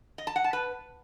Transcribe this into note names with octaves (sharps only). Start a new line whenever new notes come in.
D#5
A5
F#5
A5
B4